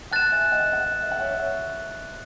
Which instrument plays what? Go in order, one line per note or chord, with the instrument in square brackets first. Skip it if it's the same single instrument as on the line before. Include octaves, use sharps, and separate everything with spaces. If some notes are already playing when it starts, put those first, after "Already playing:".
[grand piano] F#5 A5 [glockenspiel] F#6 A6 E7
[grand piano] E5 G#5
D#5 F#5
D#5 F#5
E5
F#5
C#5 E5
C#5 E5